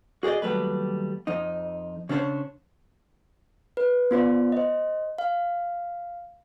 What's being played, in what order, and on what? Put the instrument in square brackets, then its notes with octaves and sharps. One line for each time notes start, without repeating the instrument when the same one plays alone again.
[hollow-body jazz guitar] F#4 G#4 C5 D5 D#5
D#2 F#3 G3 A3 B4
F2 D#4
C#3 C#4 D4 C5 C#5
[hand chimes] B4
B3 F4 C5 D5
C5 D#5
F5